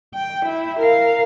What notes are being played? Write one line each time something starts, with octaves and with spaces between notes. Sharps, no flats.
G5
E4
A#4 F5